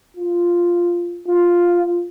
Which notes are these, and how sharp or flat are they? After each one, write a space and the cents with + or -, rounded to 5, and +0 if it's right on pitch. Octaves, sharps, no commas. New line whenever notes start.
F4 -5
F4 +0